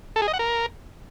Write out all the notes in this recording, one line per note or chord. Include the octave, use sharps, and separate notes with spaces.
A4
G#4
D#5
F#5
A#4